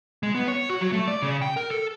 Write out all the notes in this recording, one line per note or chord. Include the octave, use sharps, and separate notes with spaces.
G#3
B3
C#5
F#4
F#3
A3
D5
C#3
G5
A#4
A4